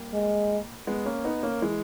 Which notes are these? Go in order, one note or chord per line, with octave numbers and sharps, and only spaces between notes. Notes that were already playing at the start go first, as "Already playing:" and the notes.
Already playing: G3 A#3
G#3
G#3 B3
A#3 C#4
B3 D#4
A#3 C#4
E3 G#3